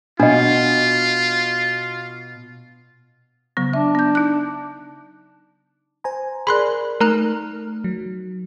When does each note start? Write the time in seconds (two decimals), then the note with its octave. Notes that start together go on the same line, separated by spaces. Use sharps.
0.20 B2 D4 F4 D#5
3.57 C#3 F#3 B3
3.74 D4 E5
3.95 B3 G6
4.15 D#4 F#6
6.04 C5 G#5 A#5
6.47 G#4 A#4 D5 B5 C6 F#6
7.01 A3 D#4 A#4 A#5 F6 F#6
7.84 F#3